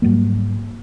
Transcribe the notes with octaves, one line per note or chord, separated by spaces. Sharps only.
G#2 F#3 G3 A#3